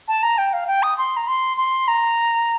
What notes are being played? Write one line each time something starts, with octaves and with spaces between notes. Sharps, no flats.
A5
A#5
G5
F5
G5
D#6
C6
A#5
C6
C6
A#5